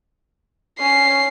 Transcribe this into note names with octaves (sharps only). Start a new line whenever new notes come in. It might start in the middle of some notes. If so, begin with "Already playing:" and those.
C#4 C7